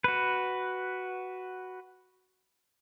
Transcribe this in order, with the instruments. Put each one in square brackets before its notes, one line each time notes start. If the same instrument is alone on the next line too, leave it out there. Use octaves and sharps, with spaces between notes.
[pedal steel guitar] F#4 B4